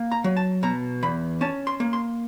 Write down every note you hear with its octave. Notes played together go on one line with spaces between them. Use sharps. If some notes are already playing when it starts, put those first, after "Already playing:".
Already playing: A#3
A#5
F#3
A5
B2 A#5
E2 B5
C#4 A5
C6
A#3
C6